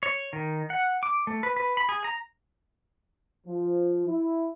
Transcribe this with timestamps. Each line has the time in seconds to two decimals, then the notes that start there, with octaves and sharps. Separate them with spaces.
0.03 C#5
0.33 D#3
0.70 F#5
1.03 D6
1.27 A3
1.43 B4
1.57 B4
1.77 B5
1.89 G#4
2.04 A#5
3.46 F3
4.07 E4